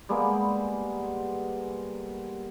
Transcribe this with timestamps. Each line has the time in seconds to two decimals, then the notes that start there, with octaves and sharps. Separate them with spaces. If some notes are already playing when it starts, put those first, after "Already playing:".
0.09 G3 G#3 A#3 B3